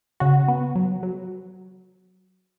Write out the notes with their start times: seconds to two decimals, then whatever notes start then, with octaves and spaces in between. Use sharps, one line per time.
0.20 C#3 F#4
0.48 B3
0.75 F#3
1.03 F#3